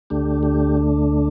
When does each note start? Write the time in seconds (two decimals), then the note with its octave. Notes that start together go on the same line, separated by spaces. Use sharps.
0.10 D2 D3 A3 D4 G4
0.43 G4